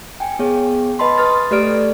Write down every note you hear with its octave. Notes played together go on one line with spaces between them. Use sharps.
G5 G#5
B3 G#4 C#5
B4 D#5 A5 B5 C6
B4 D#6 F6 A6
A3 G4 A4 D5 F6 D7